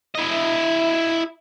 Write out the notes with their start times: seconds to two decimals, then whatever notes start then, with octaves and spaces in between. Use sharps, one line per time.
0.15 E4 D#5